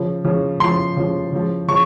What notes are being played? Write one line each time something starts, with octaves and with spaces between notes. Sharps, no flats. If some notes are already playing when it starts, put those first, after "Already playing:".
Already playing: C#3 F3
C#3 F3
C#3 F3 C6
C#3 F3
C#3 F3
C#3 F3 C#6